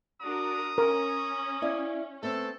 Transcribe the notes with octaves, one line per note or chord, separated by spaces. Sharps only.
D4 F#4 A#4 A#5 D#6
C#4 A#4
E4 D5 F5
A3 B3 C4 A4